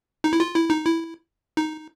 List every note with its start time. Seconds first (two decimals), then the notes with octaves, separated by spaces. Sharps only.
0.24 D#4
0.33 E4
0.40 F4
0.56 E4
0.70 D#4
0.85 E4
1.57 D#4